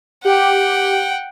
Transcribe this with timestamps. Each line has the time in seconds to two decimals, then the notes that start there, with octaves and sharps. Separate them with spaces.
0.25 G4 F#5 G5